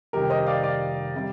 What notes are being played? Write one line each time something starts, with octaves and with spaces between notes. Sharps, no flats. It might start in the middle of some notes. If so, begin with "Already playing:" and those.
F1 F2 D#3 G3 G4 A#4
C5 D#5
D5 F5
D5 F5
C3 G3